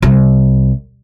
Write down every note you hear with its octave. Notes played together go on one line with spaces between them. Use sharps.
C2